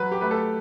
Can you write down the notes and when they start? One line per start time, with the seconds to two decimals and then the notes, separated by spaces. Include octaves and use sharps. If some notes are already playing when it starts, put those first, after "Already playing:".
Already playing: F#3 B4
0.12 G4
0.21 A3 B4
0.31 A4